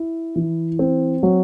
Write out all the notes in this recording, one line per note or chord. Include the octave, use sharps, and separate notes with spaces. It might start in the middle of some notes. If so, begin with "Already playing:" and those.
Already playing: E4
E3
C4
F#3